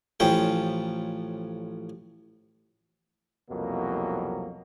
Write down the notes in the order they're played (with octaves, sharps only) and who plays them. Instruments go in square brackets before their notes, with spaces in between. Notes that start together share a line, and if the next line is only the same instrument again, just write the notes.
[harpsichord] A1 F3 C#4 G5
[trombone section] C2 F2 B2 F#3 A#3